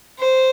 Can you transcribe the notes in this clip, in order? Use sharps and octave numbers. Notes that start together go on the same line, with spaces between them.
C5